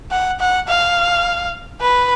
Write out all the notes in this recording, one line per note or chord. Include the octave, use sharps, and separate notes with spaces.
F#5
F#5
F5
B4